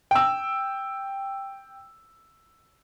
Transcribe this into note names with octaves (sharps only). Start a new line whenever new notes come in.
G5 E6